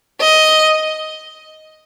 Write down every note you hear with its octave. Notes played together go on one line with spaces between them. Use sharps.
D#5